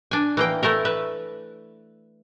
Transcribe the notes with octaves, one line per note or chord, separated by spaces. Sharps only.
D4 G#5
E3 A#3 G5
A3 E4 A#4
B4 E5